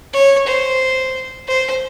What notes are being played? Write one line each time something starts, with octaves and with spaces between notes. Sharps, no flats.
C#5
C5
C5